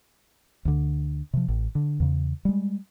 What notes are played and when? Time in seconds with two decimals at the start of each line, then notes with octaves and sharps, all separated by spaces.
0.65 D2 D3
1.33 C3 F3
1.48 A1
1.75 D3
2.00 E2 C#3
2.45 G3 G#3